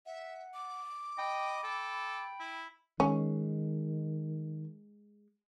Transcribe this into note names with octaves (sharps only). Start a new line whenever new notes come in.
E5 F#5
D6
D#5 G5 B5
A4 G5
E4
D#3 G#3 C#4